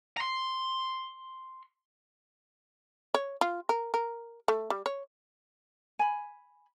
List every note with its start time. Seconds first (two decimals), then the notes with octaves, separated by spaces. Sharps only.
0.17 A#5 C6
3.14 C#5
3.41 F4
3.69 A#4
3.94 A#4
4.48 A3
4.70 G3
4.86 C#5
5.99 G#5 B5